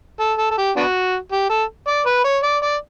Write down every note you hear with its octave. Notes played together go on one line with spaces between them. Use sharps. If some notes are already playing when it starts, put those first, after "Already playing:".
A4
A4
A4
G4
B3 D4 F#4
G4
A4
D5
B4
C#5
D5
D5